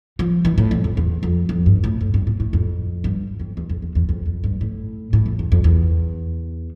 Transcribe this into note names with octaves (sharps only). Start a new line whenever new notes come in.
F3
E3
A2
F2
F2
E2
F2
F2
G2
A2
A2
G2
A2
A2
F2
G2
F2
E2
F2
E2
E2
F2
F2
G2
A2
A2
F2
E2
F2
E2